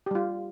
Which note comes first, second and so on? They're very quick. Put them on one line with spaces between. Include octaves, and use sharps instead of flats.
G4 G3 F4